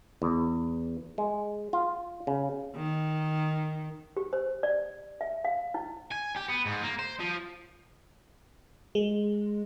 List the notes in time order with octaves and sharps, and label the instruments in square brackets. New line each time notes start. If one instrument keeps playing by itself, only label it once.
[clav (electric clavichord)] E2
G#3
F4
C#3
[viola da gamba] D#3
[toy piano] G4
C5
D5
E5
F5
E4
[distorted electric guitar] G#5
G4
B3
G#2
A#3
C5
F3
[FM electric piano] G#3